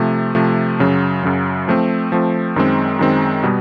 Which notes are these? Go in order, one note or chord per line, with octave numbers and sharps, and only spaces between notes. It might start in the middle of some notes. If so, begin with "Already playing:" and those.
Already playing: C3 F3 A3
C3 F3 A3
F#2 C#3 F#3
F#2 C#3 F#3
F3 A3 C4
F3 A3 C4
F#2 D#3 G#3 C4
F#2 D#3 G#3 C4
B2 G3 B3